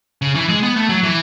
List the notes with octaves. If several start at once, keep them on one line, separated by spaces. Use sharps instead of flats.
C#3
E3
G#3
B3
A3
F#3
E3